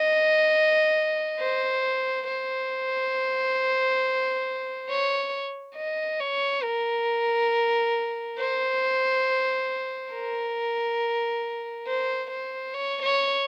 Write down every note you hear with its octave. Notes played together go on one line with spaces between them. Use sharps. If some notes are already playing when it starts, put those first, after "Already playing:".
Already playing: D#5
C5
C5
C#5
D#5
C#5
A#4
C5
A#4
C5
C5
C#5
C#5